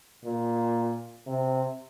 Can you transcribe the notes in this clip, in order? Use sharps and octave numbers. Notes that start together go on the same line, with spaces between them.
A#2
C3